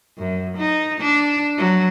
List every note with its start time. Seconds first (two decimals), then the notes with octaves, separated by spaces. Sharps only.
0.18 F#2
0.57 D#4
1.00 D4
1.58 F#3